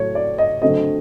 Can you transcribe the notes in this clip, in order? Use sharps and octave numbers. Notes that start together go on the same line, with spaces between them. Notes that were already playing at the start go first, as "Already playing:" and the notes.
Already playing: A2 F#3 A3 C#5
D5
D#5
D3 F#3 A3 C4 D#5